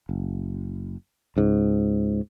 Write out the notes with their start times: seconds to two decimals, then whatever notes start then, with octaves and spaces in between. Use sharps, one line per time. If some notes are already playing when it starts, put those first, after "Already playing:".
0.09 F#1
1.36 C#2 G#2